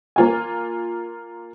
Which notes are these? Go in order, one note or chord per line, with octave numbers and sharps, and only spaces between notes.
A#3 F4 G#5